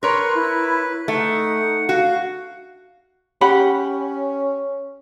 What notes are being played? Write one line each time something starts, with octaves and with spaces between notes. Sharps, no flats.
A#4 B4 C#5 C6
E4
A3 D#4 F#5
F#4 F5
C#4 G4 F#5 B5